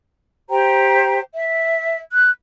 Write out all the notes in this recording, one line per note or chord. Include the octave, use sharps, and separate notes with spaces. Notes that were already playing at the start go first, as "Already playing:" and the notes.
G4 C5 G5 A#5
E5
F#6